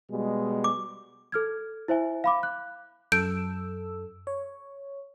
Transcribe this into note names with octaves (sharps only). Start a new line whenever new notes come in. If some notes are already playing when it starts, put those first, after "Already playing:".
B2 G3 G#3
D6
A4 F6 G#6
E4 C5 E5 G#5
F5 B5 D6
F#6
F#2 A4 E6 G6 D7
C#5